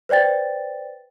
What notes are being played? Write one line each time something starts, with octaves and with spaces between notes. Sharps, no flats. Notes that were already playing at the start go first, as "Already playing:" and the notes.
B4 C5 D5 G5 A6